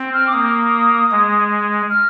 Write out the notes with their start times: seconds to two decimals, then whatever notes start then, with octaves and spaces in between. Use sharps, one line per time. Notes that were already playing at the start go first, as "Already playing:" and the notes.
Already playing: C4
0.14 F6
0.27 D6
0.33 A#3 D#6
1.12 G#3
1.90 F6